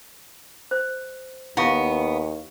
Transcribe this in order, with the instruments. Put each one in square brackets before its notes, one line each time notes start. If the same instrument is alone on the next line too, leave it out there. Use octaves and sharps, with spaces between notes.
[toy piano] C5
[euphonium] D#2 [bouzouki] B3 [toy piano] E4 F5 C#6